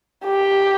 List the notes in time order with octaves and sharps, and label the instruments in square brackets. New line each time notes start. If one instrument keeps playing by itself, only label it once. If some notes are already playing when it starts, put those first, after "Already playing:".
[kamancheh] G4